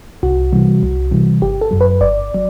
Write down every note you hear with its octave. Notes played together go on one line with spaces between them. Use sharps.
C2 F#4
C3 E3 G3
C2
C3 E3 G3
G1 G4
A4
F#2 F#3
B4
G1 D5
F#3